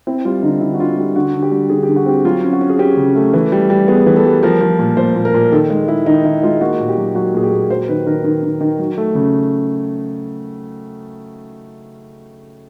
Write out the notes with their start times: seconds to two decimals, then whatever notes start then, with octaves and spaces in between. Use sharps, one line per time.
0.07 C4 E4
0.25 G3 F4
0.42 D3 D#4
0.61 D3 E4
0.74 F#4
0.79 D3 F4
0.98 G3 F4
1.16 D3 F#4
1.34 D3
1.42 G4
1.51 G3
1.70 D3 G#4
1.83 G4
1.88 D3
1.96 F#4
2.06 C4 G4
2.25 F#3 F4
2.43 C#4
2.53 F#4
2.61 C#4
2.70 G#4
2.79 C#4 G4
2.97 C#3
3.16 A3
3.34 E3
3.52 G3
3.70 G3
3.88 B3 G#4
4.06 E3
4.16 A4
4.25 G3
4.43 F3 A#4
4.61 F3
4.79 A#2
4.97 A#2 C5
5.16 A#2
5.25 A#4
5.34 A#2
5.52 D#3 A4
5.70 G#3
5.88 G#3 E4
6.06 D#3 D#4
6.24 D#3 E4
6.43 G#3 F4
6.61 A#3 F#4
6.79 A#2
6.88 G4
6.97 F#3
7.15 F#3 F#4
7.34 A#2 G#4
7.43 G4
7.52 A#2
7.70 F#3 C5
7.88 D#3 B4
8.07 D#3 A#4
8.24 D#3
8.43 D#3
8.61 D#3
8.79 F#3
8.98 A3
9.15 C#3